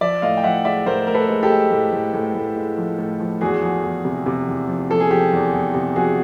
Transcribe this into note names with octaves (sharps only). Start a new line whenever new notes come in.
F3 D5 E5
A2 D#5 F5
G5
F3 E5 F#5
G#3 D5 E5
A2 A#4 C5
A2 A#4
A4 B4
G#3
G4 A4
G#3
A2
A2
A2
A2
G#3
F3
A2
F3
E2 F#4 G#4
F3
E2
C3
C3
E2
F3
F3 A4
G#4
F3 G4
E2
E2
C3
F3 F#4 G#4